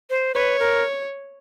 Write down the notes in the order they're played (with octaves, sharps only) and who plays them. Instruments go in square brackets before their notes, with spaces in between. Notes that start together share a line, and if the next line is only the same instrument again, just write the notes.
[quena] C5
[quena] B4 [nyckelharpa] C#5
[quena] A#4